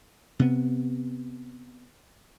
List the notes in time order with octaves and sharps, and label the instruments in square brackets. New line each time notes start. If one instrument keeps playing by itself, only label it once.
[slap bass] C3 B3